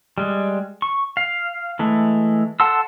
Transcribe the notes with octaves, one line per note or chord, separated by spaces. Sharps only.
G3 G#3
C#6
F5
E3 G#3 A3
A4 F#5 A5 C6 E6